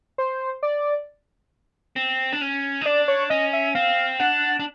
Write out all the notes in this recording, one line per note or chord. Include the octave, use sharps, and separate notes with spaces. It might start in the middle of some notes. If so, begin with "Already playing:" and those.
C5
D5
C4
D4
C#4
D#4
D4 D5
C#5
C#4 D#5
E5
C4 F5
D4 F#5
D4